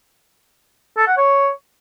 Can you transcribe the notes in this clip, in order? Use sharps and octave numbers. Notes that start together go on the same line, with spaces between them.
A4
F#5
C#5